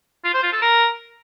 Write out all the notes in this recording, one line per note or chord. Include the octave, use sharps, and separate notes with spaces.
F4
C5
F4
A4
A#4